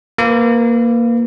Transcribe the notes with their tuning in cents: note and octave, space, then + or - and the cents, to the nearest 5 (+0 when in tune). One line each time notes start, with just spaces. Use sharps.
A#3 +0 F4 +0 B4 +20